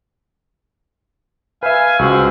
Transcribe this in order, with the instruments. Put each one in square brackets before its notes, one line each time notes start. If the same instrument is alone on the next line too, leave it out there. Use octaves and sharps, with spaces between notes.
[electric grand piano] B4 E5 [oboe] F5 [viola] G#5
[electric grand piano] C#2 [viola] F#4 C5 [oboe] E6